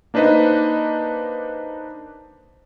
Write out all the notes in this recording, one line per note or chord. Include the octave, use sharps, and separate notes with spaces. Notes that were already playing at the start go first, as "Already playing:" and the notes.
A#3 D4 D#4 B4 C5 D#5